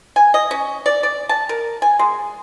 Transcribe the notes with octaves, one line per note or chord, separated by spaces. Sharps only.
G#5
D#5
C#4
D5
D5
A5
A#4
G#5
G#3